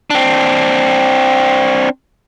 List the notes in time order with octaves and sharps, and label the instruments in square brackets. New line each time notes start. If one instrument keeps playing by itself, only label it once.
[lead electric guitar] C4 D4